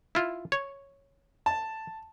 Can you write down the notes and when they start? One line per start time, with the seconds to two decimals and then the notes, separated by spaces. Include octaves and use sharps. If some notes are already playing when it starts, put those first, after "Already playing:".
0.15 E4 F4
0.52 C#5
1.46 A5